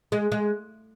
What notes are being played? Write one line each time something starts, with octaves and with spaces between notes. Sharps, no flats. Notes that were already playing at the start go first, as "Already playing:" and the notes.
G#3
G#3